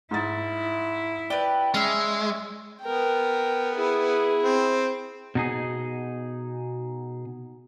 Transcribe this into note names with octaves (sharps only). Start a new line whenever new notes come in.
G#2 E4 A6
G4 B4 D5
G#3 C#4 E5
B3 A#4 G5
E4 G#4
C4
B2 D#4 G#4